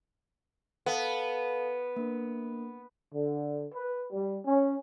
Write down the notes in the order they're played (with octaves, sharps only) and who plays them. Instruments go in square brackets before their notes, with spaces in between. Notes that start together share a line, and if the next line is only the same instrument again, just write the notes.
[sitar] B3 [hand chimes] A4 F5 A5
[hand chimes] A#3 D4 A#4
[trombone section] D3
B4
G3
C#4